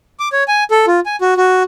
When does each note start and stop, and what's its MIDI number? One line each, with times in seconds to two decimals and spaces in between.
0.20 0.29 86
0.33 0.44 73
0.48 0.64 80
0.71 0.86 69
0.87 1.00 65
1.06 1.16 80
1.21 1.34 66
1.37 1.63 66